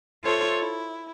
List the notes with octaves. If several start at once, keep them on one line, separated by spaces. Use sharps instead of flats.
F4 A4 C5 C#5 E5
E4